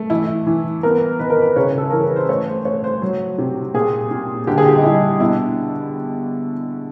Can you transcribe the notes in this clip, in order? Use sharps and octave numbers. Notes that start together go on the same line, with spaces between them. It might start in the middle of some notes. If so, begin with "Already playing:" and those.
Already playing: A3
E3 E4
E3
B3 A#4
D#3 B4
A#4
B4
C#3 C#5
A4
E3 A#4
B4
C5
A3 C#5
C5
A3 C#5
C5
F#3
C3
A#2 G#4
A#2
D3 G4
G#4
G4
D#4
G3 E4
B2 E4